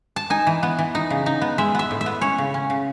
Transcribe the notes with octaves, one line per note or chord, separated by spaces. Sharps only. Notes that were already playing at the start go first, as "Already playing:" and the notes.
A5
D#4 G#5
E3
B3
E3
D#4
C#3
D#4
B3
G#3 E5
B3 E5
A2
E5
B3
C#4 C#5
C#3
C#4
C#3